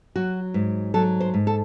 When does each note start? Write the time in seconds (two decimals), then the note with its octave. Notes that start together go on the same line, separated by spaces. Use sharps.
0.16 F#3 F#4
0.54 G#2
0.94 F#3 A4
1.20 C5
1.34 G#2
1.47 A4